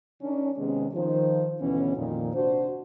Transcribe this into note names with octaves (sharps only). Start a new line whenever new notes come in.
D#3 C#4 D4
C3 D#3 G#3 B3 C#4
D#3 F3 C5
D2 B2 E3 B3 C#4
F2 A#2 D#3
C3 D4 F#4 C5